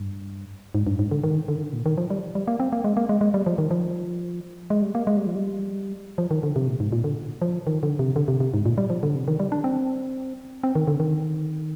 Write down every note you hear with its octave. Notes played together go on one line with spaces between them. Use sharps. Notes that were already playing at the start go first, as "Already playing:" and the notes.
Already playing: G2
G#2
G2
G#2
D3
D#3
D3
D#3
D3
A#2
D#3
F3
G3
G3
A#3
C4
A#3
G#3
A#3
G#3
G#3
G3
F3
D#3
F3
G#3
G3
A#3
G#3
G3
F3
G3
F3
D#3
D3
C3
A#2
G#2
A#2
D3
F3
D#3
D3
C3
D3
C3
C3
G#2
A#2
G3
F3
D3
C3
D#3
G3
D4
C4
C4
D#3
D3
D#3